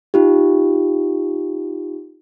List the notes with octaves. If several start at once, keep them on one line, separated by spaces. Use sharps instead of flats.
D#4 F4 G4